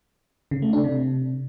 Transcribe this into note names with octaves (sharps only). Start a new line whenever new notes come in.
C#3
A3
D4
C3